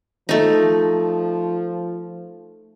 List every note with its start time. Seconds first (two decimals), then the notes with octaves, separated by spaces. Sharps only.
0.29 F3 A3 D#4